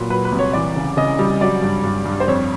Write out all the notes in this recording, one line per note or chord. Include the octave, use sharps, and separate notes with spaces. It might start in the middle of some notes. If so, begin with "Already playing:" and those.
Already playing: A#2 F#3 B4
F#3 B4
B4
C2
C#5
E3 D5
C#3
C#3 D#5
G3
F#3 D5
G2
G2
G2
C5
F2 C#5